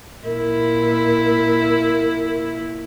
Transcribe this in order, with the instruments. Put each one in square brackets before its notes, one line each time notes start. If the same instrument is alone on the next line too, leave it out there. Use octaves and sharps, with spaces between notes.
[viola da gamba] A#2 E4 [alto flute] A#4